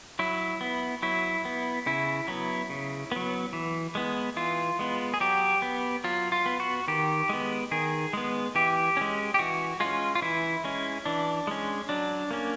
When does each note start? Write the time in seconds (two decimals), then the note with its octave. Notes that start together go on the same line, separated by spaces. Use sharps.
0.19 F#3 E4
0.61 B3
1.02 F#3 E4
1.45 B3
1.86 C#3 E4
2.28 F#3 B3
2.70 C#3
3.12 F#3 B3
3.53 E3
3.95 G#3 B3
4.37 E3 F4
4.79 G#3 B3
5.14 G#4
5.20 F#3 G4
5.62 B3
6.04 F#3 F4
6.32 F4
6.46 B3
6.60 F#4
6.88 D#3 G4
7.29 G#3 B3
7.71 D#3 G#4
8.13 G#3 B3
8.55 E3 G4
8.97 G#3 C#4
9.34 G4
9.39 E3 F#4
9.80 G#3 C#4 F4
10.15 F4
10.22 E3 E4
10.64 G#3 C#4
11.06 E3 D4
11.47 G#3 C#4
11.89 F#3 D4
12.31 A#3 C#4